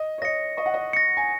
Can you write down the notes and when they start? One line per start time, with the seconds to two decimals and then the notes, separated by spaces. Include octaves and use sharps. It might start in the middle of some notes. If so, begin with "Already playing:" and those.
Already playing: D#5
0.18 C#5
0.22 D#5 A#6 C#7
0.57 D#5 C#6
0.66 F#5
0.74 D#5
0.93 A#6 C#7
1.17 G#5